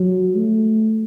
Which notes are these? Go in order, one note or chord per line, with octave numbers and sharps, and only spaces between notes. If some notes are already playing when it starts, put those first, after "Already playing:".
Already playing: F#3
A3